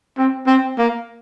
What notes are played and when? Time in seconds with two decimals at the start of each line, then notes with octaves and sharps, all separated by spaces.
0.18 C4
0.47 C4
0.78 A#3